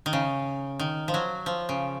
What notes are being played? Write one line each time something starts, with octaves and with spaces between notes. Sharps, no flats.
D#3
C#3
D#3
F3
F#3
F3
C#3